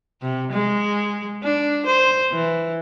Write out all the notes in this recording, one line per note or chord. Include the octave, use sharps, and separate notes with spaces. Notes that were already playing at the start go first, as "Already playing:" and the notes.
C3
G#3
D4
C5
E3